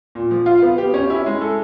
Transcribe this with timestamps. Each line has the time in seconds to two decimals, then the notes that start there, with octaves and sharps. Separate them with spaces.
0.15 A#2
0.31 F3
0.46 F4
0.62 B3
0.78 G4
0.94 C#4
1.10 E4
1.26 G#3
1.41 A4